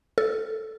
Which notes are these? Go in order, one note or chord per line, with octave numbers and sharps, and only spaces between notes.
A4